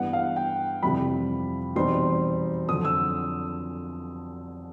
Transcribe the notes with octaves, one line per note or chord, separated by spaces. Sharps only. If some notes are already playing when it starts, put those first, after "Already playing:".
Already playing: G2 E3 G3 B3 F#5
F5
G5
F2 C3 E3 G3 B5
E2 B2 G3 C4 D#4 C6
F2 D3 F#3 D#6
E6